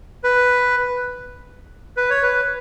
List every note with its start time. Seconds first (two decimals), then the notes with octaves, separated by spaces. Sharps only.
0.24 B4
1.97 B4
2.10 C#5
2.23 B4